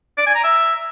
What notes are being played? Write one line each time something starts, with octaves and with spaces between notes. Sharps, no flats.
D5
G#5
A#5
E5